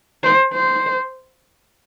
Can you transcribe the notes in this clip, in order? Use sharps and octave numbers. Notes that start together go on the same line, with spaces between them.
C5
C5